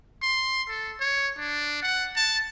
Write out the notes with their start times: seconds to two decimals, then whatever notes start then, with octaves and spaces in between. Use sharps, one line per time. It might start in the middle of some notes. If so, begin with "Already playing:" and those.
0.22 C6
0.69 A4
1.00 C#5
1.38 D4
1.83 F#5
2.16 A5